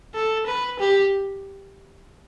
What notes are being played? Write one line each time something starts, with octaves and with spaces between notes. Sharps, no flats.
A4
B4
G4